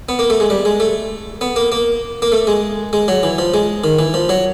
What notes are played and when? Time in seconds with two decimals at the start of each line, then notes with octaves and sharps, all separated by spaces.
0.09 B3
0.19 A#3
0.30 A3
0.40 G#3
0.50 G3
0.65 G#3
0.80 A3
1.41 B3
1.56 A#3
1.72 A#3
2.22 A#3
2.32 A3
2.47 G#3
2.93 G#3
3.08 F#3
3.23 E3
3.38 F3
3.54 G#3
3.84 D#3
3.99 E3
4.14 F3
4.29 F#3